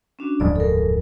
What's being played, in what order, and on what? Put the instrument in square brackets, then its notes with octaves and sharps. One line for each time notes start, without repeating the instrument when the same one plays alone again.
[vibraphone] C#4 D4 F#4
[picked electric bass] D1 F2 G#2 [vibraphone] D5
[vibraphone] A4 A#4